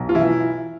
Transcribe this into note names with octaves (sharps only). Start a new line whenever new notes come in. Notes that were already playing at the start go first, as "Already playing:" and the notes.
Already playing: B1
F4
E3 E4